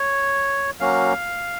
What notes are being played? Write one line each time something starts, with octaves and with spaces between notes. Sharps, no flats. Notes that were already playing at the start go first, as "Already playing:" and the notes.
Already playing: C#5
F#3 A#3 C#4 F#4 F5